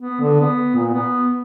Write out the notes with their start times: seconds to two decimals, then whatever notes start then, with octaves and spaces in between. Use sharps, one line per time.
0.01 B3
0.21 D3
0.40 B3
0.76 A#2
0.93 B3